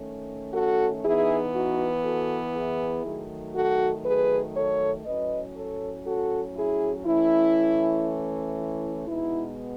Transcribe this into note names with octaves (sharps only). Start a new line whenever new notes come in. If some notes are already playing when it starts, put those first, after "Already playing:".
Already playing: D#3 A3 C#4
F#4 A4
E3 B3 D#4 E4 G#4
D#4 F#4
F#4 A4
E4 G#4
D#3 F#3 A3
F#4 A4
G#4 B4
A4 C#5
A2 F#3 C#4 B4 D#5
A4 C#5
F#4 A4
E4 G#4
E3 A3 C#4 E4
E4
B2 G#3 B3 D#4 E4